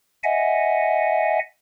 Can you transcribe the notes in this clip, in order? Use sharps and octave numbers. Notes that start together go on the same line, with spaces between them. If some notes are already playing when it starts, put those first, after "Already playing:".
D#5 E5 F#5 G#5